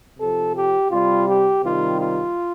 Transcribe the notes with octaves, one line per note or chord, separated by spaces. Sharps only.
C3 F3 A4
G4
C3 G3 F4
G4
C3 D#3 G3 F4
F4